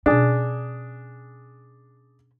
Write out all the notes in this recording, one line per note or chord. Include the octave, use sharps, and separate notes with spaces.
B2 C#4 D4 G#4